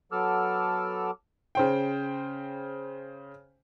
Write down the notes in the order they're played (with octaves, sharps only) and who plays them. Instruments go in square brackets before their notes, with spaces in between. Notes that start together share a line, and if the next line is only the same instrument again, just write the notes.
[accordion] F#3 B3 A4 D6 E6 F6
[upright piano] C#3 C5 G5